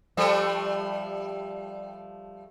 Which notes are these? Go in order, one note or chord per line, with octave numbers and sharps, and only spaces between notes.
F3 G3 A3